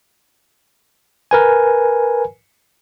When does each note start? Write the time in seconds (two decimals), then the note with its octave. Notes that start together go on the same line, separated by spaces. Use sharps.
1.31 A#4 B4 G#5